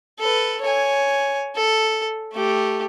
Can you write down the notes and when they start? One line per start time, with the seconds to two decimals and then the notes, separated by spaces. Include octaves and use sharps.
0.19 A4 B4
0.62 C#5 G#5
1.56 A4
2.33 A3 G4